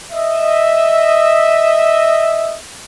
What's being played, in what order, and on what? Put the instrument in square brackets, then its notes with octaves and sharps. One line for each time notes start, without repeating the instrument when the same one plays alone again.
[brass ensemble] D#5 E5